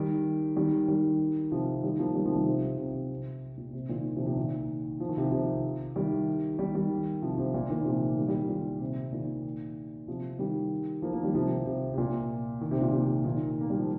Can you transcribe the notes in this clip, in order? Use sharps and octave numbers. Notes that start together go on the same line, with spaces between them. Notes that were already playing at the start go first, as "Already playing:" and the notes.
Already playing: D#3 G3
D#3 G3
D#3 G3
C3 F3
D#3 G3
F3 A#3
D#3 G3
C3 F3
D#3 G3
C3 F3
C3
C3
A#2
C3
A#2 D#3
C3 F3
C3 F3
A#2 D#3
F3
D#3
C3 F3
C3 F3
D#3 G3
D#3 G3
D#3 G3
C3 F3
C3 F3
A#2
A#2 D#3
C3 F3
D#3 G3
D#3 G3
A#2 D#3
C3
A#2 D#3
C3 F3
D#3 G3
F3 A#3
F3 A#3
D#3 G3
C3 F3
C3
C3
A#2
D#3
C3
A#2
C3
A#2 D#3
A#3
G3
F3